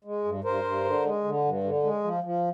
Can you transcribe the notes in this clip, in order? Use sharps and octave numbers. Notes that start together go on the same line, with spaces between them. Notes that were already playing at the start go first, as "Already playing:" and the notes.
G#3
G2
G2 A#4 C5
G2
D3
G#3
D3
G2
D3
G#3
F3
F3